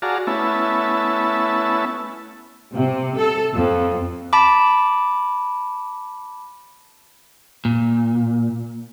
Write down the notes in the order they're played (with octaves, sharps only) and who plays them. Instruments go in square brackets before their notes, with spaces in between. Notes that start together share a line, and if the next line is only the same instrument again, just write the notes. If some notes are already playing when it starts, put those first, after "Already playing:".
[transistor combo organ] F#4 G#4 D5 F5 A5 A#5
A3 B3 C#4 E4 E5 A5
[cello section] C3
A4
F2
[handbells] A5 B5 D6
[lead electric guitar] A#2